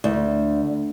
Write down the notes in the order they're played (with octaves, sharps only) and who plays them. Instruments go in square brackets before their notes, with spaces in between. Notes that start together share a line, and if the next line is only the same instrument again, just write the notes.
[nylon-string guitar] D2